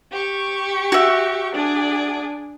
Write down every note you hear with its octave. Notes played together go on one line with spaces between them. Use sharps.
G4 C#6
F#4 E5
D4 G#4 D5